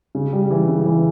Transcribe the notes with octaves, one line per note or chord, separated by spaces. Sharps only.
C#3
G3
E3
C#3
E3